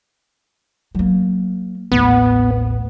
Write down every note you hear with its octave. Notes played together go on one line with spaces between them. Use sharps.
F#3 A#3
A1 D#2 B3